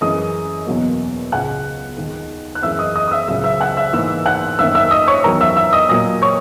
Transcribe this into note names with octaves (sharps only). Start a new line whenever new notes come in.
F#2 E3 G#3 D#5 D#6
E2 B2 F#3 A#3
C#2 C#3 G#3 F#5 F#6
D#2 D#3 G#3
F#6
F#2 E3 G#3 E5 E6
D#5 D#6
D#5 D#6
D#6
E5 E6
C#2 C#3 F#3 E5 E6
E5 E6
F#5 F#6
E5 E6
G#2 E3 A#3 E5 E6
F#5 F#6
F#2 D#3 A#3 E5 E6
E5 E6
D#5 D#6
C#5 C#6
E2 D#3 F#3 A#4 A#5
E5 E6
E5 E6
D#5 D#6
A#2 F#3 A#3 D#5 D#6
C#5 C#6